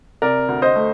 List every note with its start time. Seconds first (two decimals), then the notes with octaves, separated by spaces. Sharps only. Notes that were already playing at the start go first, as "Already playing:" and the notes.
0.22 C3 A#4 D5
0.48 D2
0.62 C5 D#5
0.76 A3